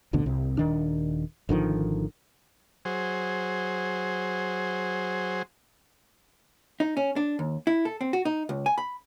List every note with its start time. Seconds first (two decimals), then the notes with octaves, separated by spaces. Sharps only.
0.13 A1 D2 B2 D3
0.26 C2 C3
0.58 D#1 D#3 D4
1.49 G#1 D3 D#3 F3
2.85 F#3 G#4 C5
6.80 D#4
6.97 C#4
7.16 D4
7.39 D#2
7.67 E4
7.85 A4
8.01 C4
8.13 F#4
8.25 D#4
8.49 C#2
8.66 G#5
8.78 B5